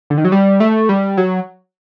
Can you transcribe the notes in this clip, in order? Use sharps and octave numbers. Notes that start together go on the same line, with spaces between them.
D3
D#3
F#3
G3
A3
G3
F#3